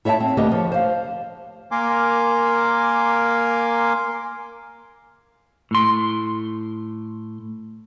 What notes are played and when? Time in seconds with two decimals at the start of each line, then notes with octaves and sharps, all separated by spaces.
0.05 E4 C#5 E5 F#5 A5
0.20 C4
0.37 D2 A#3 G4 B4 D#5
0.52 F3 C#5
0.72 C5 F5
1.72 A#3 A#4 G#5 C6 D6
5.71 A2 C6